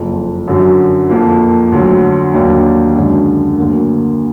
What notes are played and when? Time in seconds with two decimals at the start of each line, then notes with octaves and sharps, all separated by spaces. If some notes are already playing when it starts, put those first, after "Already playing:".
Already playing: F#1 F2 F3
0.48 F#2 D3 F#3
1.09 F2 F3 A#3
1.72 D2 D3 F#3
2.34 D#2 D#3 F#3 D4
2.96 F#2 D3 G#3 D4
3.57 D2 D3 F#3 A#3